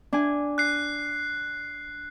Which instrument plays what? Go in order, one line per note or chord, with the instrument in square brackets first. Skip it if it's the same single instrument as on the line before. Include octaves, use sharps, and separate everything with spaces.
[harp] D4 G#5
[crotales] F#6 C7